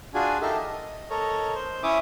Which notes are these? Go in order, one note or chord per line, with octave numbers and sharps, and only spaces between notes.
D4 F4 F#4 G#4 G#5
D#4 G4 A4 A#4 E5 F5
D#5
A4 A#4 C#5 D#5
C5
C#4 E4 C#5 E5 D6 D#6